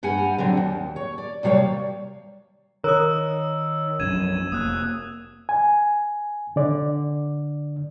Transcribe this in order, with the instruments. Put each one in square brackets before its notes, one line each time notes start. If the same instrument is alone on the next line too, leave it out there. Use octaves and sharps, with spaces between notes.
[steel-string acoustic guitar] G2 G4 F#5 G#5
D3 F#3 C4
D#2
C#5
D5
D#2 C3 G3 C#5 F5
[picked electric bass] D#3 [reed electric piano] A#4 [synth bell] C#5 D#6 [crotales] E6
[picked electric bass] A#1 F#2 [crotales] G#6 E7 [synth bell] D#7
[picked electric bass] F1 A#3 [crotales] D#6 F#6
[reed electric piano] G#5
D3 D5